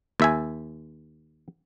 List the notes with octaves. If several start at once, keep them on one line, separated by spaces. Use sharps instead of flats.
D#2 E5 G#5